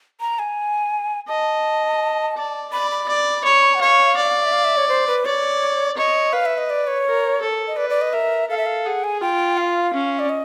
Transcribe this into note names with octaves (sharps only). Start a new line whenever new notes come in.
A#5
G#5
D#5 A5
D5
D5 B5
B5
D5
C#5
F#5
C#5 F5
D5
E5
F5
E5
C#5
C5
B4
C#5 D5
C#5 D#5
B4 F5
E5
D#5
D5
C#5
A#4
A4
D#5
B4 D5
D5
D#5
A#4 E5
A4 F5
E5
F5
G#4 F#5
G#5
F4 G5
F5
C#4
D5
D#5